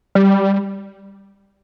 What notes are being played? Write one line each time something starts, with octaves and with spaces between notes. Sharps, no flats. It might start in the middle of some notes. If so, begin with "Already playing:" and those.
G3